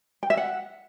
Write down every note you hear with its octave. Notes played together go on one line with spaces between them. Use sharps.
G5
E5
F#5